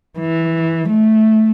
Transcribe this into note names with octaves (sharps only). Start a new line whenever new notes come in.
E3
A3